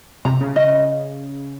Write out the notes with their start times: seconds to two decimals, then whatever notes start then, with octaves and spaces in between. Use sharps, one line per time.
0.25 C3 A#5
0.41 C#3
0.56 C#3 D#5